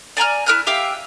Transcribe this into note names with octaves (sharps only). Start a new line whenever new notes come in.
D5 G#5 A#5 F6
E4 A#4 F6 F#6
G4 E5 F5 G5